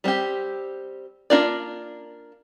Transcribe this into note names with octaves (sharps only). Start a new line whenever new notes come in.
G3 C4 G4
A#3 D4 F4 A#4 D5